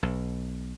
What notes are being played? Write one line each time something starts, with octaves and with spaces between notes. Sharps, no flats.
B1